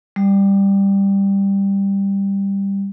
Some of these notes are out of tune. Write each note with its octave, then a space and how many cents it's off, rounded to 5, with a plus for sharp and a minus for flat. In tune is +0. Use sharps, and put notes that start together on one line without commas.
G3 +10